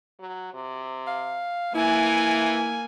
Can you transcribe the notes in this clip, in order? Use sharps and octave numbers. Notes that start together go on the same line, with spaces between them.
F#3
C3
F5
E3 A#3 E4 G#5